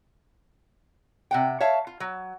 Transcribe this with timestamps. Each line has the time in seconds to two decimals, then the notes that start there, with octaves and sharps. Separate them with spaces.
1.31 C3 F#5 G5
1.60 C#5 E5 F5 A5
1.87 F4
2.00 F#3